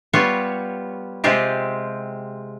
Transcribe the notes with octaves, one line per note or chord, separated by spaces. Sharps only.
G3 B3 F4 C#5
C3 G#3 C4 F4 G4